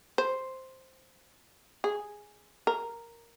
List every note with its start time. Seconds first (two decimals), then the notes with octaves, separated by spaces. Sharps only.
0.18 C5
1.84 G#4
2.67 A#4